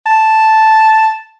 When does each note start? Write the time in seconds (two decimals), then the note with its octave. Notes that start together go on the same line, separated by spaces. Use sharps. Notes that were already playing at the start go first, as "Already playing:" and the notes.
0.06 A5